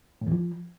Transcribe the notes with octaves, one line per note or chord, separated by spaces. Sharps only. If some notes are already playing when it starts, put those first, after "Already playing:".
A2
E2
F3